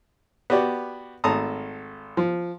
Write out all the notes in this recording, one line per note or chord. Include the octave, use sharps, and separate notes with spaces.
B3 F#4 G4 D5
G#1 A3 A5 A#5 D#6
F3